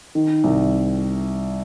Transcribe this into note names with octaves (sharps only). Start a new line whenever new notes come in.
D#3
C2